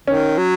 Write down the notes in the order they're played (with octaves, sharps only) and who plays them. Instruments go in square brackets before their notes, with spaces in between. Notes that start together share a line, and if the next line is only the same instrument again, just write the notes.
[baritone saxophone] D#3 [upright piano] C#4
[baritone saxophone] F#3